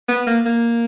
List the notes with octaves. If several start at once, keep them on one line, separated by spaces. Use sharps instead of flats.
B3
A#3
A#3